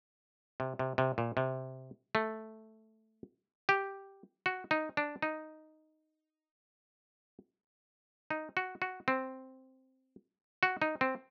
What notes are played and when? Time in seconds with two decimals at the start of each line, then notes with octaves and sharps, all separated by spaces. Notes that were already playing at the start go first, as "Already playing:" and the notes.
0.60 C3
0.79 C3
0.98 C3
1.18 A#2
1.37 C3
2.15 A3
3.69 G4
4.46 F#4
4.71 D#4
4.97 D4
5.22 D#4
8.30 D#4
8.57 F#4
8.82 F#4
9.08 C4
10.63 F#4
10.82 D#4
11.01 C4